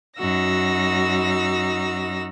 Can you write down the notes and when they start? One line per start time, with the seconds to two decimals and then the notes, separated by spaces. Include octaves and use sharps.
0.17 F#2 D#4 F#4 E6 A#6